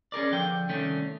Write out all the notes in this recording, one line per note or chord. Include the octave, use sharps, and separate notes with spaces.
C#4 G#4 A#4 D5
D3 F3 G5
C2 D3 D#3 A3 C#4